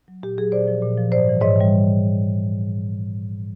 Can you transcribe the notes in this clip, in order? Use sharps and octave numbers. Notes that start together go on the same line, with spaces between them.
F#3
A#2 G4
F#3 G#4
A#2 C5 D5
F3
A#2
F3
G#2 C5 D5
E3 G3
G#2 C#5 D#5
E3 G3